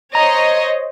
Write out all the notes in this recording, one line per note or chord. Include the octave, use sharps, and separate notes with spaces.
C5 C#5 D#5 A#5